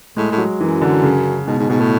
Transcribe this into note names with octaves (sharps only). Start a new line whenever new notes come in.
A2 G#3
A2
F#3
F#2 E3
D3
C#3
G#2 B2
G#2
G#2 B2
A2